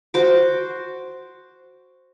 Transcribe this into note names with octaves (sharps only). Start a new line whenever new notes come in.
F#4 C5 D6